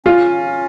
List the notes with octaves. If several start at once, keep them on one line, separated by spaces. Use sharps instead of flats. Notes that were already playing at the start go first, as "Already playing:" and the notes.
C#4 F4